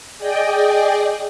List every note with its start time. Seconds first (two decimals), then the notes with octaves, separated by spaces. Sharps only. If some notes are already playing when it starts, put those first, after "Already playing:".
0.18 G#4 D5 D#5 G5